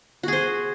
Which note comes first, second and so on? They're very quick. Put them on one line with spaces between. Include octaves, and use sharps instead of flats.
F#4 G#4 C5